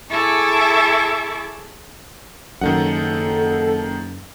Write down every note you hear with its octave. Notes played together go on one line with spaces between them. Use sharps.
E4 G#4 A4 E5 C#6 D6
F#1 F#2 D#3 D#4 A4 F#5